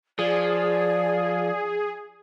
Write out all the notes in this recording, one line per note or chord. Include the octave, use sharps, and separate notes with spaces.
F3 G#4 D5